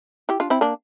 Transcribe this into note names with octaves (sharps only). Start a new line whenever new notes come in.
E4 G4
D4 F4
C4 E4
A#3 D4